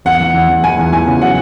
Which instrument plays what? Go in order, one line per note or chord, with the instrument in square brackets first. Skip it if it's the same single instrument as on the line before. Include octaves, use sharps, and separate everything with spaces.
[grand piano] E2 [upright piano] F#5
[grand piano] E3
E2
E2
[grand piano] E3 [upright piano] G#5
[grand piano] E2
[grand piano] E3 [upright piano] G#5
[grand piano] C#3
[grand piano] F#3 [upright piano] F#5